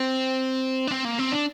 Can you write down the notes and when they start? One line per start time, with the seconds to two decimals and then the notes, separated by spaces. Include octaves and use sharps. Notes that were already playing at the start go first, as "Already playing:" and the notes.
Already playing: C4
0.87 D4
0.91 C4
1.05 A#3
1.19 C4
1.33 D4